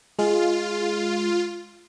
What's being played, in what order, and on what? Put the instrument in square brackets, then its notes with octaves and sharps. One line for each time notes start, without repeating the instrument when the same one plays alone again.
[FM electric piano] G#3 [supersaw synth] F4